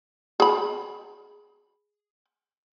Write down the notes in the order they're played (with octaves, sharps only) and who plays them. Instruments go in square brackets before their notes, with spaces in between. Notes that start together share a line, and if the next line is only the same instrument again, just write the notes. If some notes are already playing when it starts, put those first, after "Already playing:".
[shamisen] G#4 B5